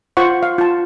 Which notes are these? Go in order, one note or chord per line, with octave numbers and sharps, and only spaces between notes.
F4 C5 F#5 C#6
F5
F4 A5